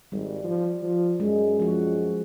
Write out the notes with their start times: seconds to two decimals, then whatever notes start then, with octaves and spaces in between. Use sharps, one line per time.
0.12 G#1 G3
0.44 F3
0.83 F3
1.20 F#2 G#3
1.60 F3 F#4